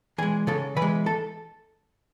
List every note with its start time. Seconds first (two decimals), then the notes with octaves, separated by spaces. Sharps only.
0.18 E3 G#4 G#5
0.23 G#3
0.47 C#3 A4 A5
0.77 E3 B4 B5
0.82 G#3
1.06 A4 A5